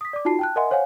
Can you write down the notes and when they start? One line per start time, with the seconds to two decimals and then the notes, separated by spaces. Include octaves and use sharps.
0.01 D#6 B6
0.13 D5 D6
0.25 D#4 F4 F#4 A5 C7
0.39 G5 A5 F#6
0.56 A#4 D#5 E5 F#5 G#5 C6
0.71 C5 C#5 F5 F#5 G#5